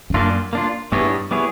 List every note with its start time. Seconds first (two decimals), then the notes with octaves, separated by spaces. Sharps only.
0.10 F2
0.14 F#2 A#3 D4 F4
0.53 A#3 D4 F4
0.92 G2 G3 B3 E4 G#4 C#5
1.31 G3 B3 E4 G#4 C#5